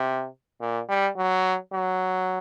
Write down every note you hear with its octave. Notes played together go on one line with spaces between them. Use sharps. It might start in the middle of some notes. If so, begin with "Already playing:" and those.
Already playing: C3
A#2
G3
F#3
F#3